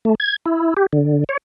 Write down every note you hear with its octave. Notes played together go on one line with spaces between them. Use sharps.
A3
G#6
E4
G4
D3
C#5